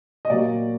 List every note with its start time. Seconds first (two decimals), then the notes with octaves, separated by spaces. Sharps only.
0.25 D#5
0.30 A#2 F#3 D5